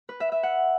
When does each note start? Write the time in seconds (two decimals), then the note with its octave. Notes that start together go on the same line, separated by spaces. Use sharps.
0.09 B4
0.20 E5
0.32 E5
0.43 F#5